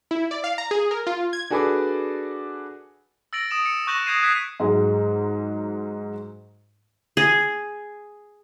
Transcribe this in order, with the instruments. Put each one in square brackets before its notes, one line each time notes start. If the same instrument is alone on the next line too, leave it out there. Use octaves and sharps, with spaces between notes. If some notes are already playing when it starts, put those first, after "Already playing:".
[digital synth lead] E4
D5
F5
A#5
G#4
A#4
F4
G#6
[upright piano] D4 F#4 G#4 A4 B4 D5
[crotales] E6 A6 A#6 D7 F#7
D#6 D7 E7
C#7
C#6 F#6 G6 A#6 E7 F#7
D#6 G6 G#6 A#6 C7 D#7
D#6 F#6 G#6 B6 C7 D#7
[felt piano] G#2 F#3 G#3
[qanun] G#4